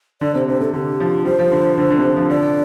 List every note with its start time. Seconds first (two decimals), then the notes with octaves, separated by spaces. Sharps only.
0.21 D3 D5
0.35 C3 C5
0.48 C3 C5
0.60 C3 A4
0.73 D3 G4
1.00 F3
1.25 G3 C5
1.39 F3
1.52 D3
1.78 D3
1.90 D3
1.98 C3
2.03 D3
2.17 F3
2.30 D3 D5